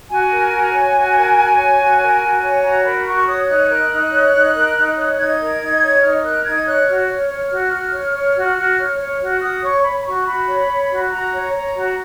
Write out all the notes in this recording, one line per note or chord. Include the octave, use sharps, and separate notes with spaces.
F#4 G#5
A#4
F#4
C#5
F#4
A#4
F#4
C#5
F#4
A#4
F#4
C#5
F#4 A#5
A#4 B5
F#4 C#6
C#5 D#6
D#4 F#6
A#4
D#4
C#5
D#4
A#4
D#4
C#5
D#4 G#6
A#4
D#4
C#5
D#4 F6
A#4 F#6
D#4 G#6
C#5 F#6
F#4 F6
C#5
C#5
F#4
F#4
C#5
C#5
F#4
F#4
C#5
C#5
F#4
F#4 D#6
C#5 C#6
C#5 B5
B5
F#4 C#6
F#4 B5
C#5
C#5
F#4
B5
F#4 A#5
C#5
C#5
F#4